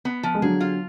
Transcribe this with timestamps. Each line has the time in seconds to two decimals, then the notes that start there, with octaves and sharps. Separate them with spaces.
0.05 B3
0.23 F3
0.35 G#3
0.42 D3 F#3 G#4
0.60 F4